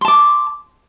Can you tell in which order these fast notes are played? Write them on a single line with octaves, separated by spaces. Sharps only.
C6 A5 D6